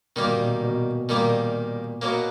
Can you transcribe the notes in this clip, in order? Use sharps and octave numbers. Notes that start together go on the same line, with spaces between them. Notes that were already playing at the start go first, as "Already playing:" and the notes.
B2 D#3 G3 A#3
A#2
B2
B2
A#2 D#3 G3 A#3
B2 F#3 A#3